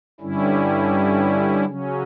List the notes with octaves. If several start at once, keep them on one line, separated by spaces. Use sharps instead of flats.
G2 D3 G3 C#4 E4
C#3 F#3 C#4